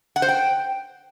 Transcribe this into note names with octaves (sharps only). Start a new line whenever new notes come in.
F#5
C5
G5